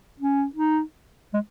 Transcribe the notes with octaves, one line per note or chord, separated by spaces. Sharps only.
C#4
D#4
G#3